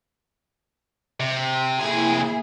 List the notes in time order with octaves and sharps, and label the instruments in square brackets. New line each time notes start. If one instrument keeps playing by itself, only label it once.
[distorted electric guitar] C3
[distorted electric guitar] C3 G#5 [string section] A#3 E4 G#4